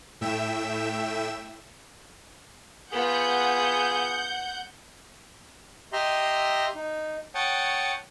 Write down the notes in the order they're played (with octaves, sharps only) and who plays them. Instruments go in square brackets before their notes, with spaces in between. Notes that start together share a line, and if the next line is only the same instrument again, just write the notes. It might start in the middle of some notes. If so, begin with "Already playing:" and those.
[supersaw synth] A2 E5 G5 E7
[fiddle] B3 F4 [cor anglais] G#4 [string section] F#5 G6
[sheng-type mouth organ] G4 D#5 E5 A#5 C6
D#4
C#5 F#5 G5 A5 C#6 D#6